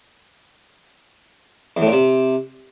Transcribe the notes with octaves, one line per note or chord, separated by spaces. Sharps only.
E2
A2
A#2
C3